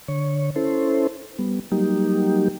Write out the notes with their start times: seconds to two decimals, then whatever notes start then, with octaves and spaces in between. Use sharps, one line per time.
0.08 D3 C#5
0.56 C#4 E4 A4 C5
1.39 G3 B3
1.72 F#3 G3 A#3 D#4 G4